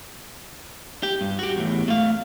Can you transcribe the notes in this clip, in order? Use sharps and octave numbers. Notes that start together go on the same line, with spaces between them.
G4
G2
F#4 G4
E2 A2
A3 F5